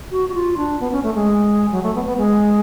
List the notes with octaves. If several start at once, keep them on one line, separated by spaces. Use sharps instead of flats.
F#4
F#4
F4
D4
B3
C#4
A3
G#3
F#3
A3
B3
B3
G#3